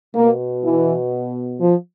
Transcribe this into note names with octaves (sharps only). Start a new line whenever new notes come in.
B2 A#3
E3
F3